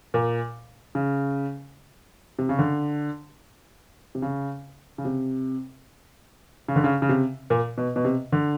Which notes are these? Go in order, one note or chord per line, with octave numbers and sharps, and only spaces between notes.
A#2
C#3
C3
C#3
D3
C3
C#3
C#3
C3
C#3
D3
C#3
C#3
C3
A#2
B2
B2
C3
D3